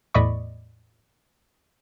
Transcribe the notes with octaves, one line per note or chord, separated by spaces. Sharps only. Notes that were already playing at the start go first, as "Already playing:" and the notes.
E2 A2 D5 D#5 B5 C#6